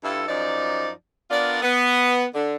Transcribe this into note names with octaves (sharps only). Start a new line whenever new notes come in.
G2 E4 F4 A4
F#2 F3 D#4 D5
B3 D4 F4 A#4 D5
B3
D3